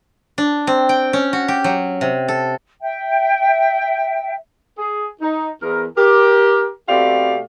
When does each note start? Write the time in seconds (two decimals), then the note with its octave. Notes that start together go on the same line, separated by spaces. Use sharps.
0.38 D4
0.67 C4
0.89 G5
1.13 C#4
1.33 F#4
1.48 G4
1.64 F#3
2.01 C3
2.28 A4
2.81 E5 G5
4.78 G#4
5.22 D#4
5.62 E2 A#4
5.97 G4 A#4
6.89 B2 A3 C4 G4 D5 F5